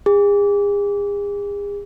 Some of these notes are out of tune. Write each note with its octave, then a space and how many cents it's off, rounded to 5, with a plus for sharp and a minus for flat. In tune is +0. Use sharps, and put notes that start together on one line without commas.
G#4 -40